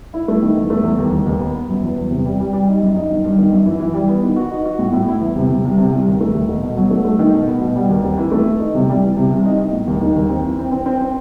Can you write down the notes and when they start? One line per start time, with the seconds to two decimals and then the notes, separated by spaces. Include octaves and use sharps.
0.14 E4
0.28 A3
0.42 D#3
0.56 E2
0.70 A3
0.84 E2
0.98 D#2
1.13 D#2
1.26 D#2
1.40 B3
1.55 B3
1.69 F#2
1.82 E2
1.97 E2
2.11 C3
2.26 G3
2.40 G3
2.53 G3
2.68 D#4
2.81 F#2
2.96 D#4
3.10 D#3
3.24 G2
3.39 D#3
3.53 F#2
3.66 E3
3.80 E3
3.94 G3
4.09 B3
4.23 D#3
4.36 F#4
4.51 D#4
4.66 F#4
4.79 A2
4.93 A2
5.08 E4
5.21 E2
5.36 C3
5.50 C3
5.64 C2
5.78 C3
5.93 C2
6.07 D#2
6.21 A3
6.34 D#2
6.49 B2
6.63 B2
6.77 F#3
6.91 A3
7.05 A3
7.19 D#3
7.33 B2
7.48 B3
7.61 B2
7.76 G3
7.89 D#2
8.03 C4
8.18 E3
8.32 A3
8.46 E3
8.60 D#4
8.75 C3
8.89 G3
9.03 E3
9.17 C3
9.30 C2
9.46 D#4
9.59 D#4
9.73 A2
9.88 D#2
10.01 D#3
10.16 D#2
10.29 C4
10.44 E3
10.59 C4
10.72 C4
10.86 C4
11.01 C4